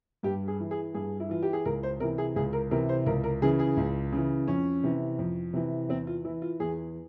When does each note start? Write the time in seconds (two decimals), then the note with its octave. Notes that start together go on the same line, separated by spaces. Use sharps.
0.23 G2 G4
0.48 G#4
0.60 E3
0.71 G#4
0.94 G2 G#4
1.20 E4
1.30 E3 F4
1.43 G4
1.53 G#4
1.65 C#2 A#4
1.83 C5
2.00 C3 E3 A#4
2.18 G#4
2.36 C#2 G#4
2.53 A#4
2.71 C3 E3 A#4
2.89 C5
3.06 C#2 A#4
3.24 A#4
3.42 C#3 E3 G#4
3.59 G#4
3.77 C#2
4.12 C#3 E3
4.48 F2 C#4
4.84 C3 E3
5.19 F2
5.54 C3 E3
5.89 E2 C4
6.07 F4
6.25 E3 E4
6.42 F4
6.60 E2 G#4